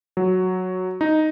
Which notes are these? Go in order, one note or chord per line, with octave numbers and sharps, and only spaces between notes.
F#3
D#4